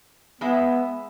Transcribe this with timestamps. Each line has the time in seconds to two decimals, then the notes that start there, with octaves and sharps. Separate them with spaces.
0.41 G#3 B3 E4 E5